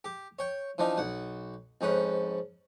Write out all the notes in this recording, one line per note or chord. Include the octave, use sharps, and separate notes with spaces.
G4
C#5 G5
E3 F3 D4 D#4
B1 F#5
F2 G#2 C#4 B4